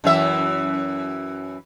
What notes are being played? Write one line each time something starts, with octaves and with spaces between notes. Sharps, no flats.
F#2 E3 E5